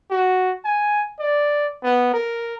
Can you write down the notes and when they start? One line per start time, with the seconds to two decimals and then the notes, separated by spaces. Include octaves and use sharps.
0.11 F#4
0.65 G#5
1.20 D5
1.84 B3
2.14 A#4